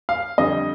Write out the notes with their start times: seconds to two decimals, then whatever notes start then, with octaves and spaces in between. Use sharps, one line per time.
0.09 F5
0.38 F2 D3 G3 D#5